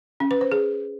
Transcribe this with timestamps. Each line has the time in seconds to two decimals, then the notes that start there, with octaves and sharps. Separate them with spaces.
0.20 C#4
0.31 B4
0.41 C5
0.52 G#4